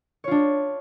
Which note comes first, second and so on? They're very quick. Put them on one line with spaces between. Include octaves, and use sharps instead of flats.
C#5 F4 D4